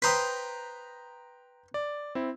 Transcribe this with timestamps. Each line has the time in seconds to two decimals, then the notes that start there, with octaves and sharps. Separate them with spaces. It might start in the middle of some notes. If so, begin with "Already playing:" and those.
0.02 B4 C5 G5 A#5 D#6 B6
1.74 D5
2.15 C4 E4